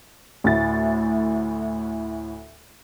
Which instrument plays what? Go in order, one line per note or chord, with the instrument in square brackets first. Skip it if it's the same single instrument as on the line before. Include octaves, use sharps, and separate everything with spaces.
[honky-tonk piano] D2 A2 A6